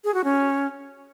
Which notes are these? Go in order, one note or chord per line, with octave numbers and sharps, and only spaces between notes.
G#4
F#4
C#4